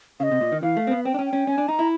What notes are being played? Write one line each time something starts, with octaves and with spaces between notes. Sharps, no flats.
C#3 D#5 F5
C3
A#2
D#3
E3 F5
A3
C4
B3
C4 G5
D4
C#4
G5
C#4
C#4 G#5
D4
D#4 A#5
E4